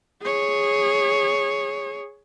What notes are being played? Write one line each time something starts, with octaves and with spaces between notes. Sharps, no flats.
G#4 C#5